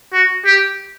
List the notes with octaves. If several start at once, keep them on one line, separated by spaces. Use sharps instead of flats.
F#4
G4